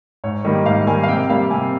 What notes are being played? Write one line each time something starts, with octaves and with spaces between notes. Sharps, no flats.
G#2 C#5
D#3 G3 A#3 D#5
G#2 F5
D#3 G3 A#3 G#5
F5
C3 G5
G5
G3 A#3 F5
C3 G#5